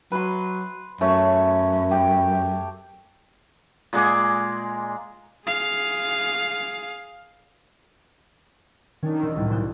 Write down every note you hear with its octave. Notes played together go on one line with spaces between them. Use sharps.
F#3 B4 C6
F#2 A3 C#5
G4
A#2 G#3 G#4 D6
G#4 F5
D#3 C#4 D4 C#5
E1 E6
C2 A2
B1 C5 F#6